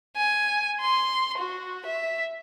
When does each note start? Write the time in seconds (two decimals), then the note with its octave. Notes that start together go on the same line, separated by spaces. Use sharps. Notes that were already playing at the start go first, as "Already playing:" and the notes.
0.17 G#5
0.81 C6
1.38 F#4
1.86 E5